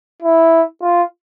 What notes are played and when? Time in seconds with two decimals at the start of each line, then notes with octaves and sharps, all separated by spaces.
0.22 E4
0.82 F4